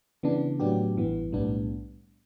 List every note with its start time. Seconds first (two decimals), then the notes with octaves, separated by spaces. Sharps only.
0.23 C#3 E3 B3 D4
0.59 A2 F#3 B3 D4 G4
0.96 A1 G2 E3 B3
1.32 B1 A2 G3 B3 D4